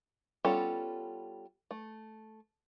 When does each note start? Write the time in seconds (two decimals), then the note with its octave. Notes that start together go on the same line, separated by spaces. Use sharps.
0.45 G3 B3 C#4 F4 A4
1.71 A3